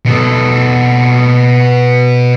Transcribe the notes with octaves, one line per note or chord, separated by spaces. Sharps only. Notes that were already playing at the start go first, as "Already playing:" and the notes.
B2 A4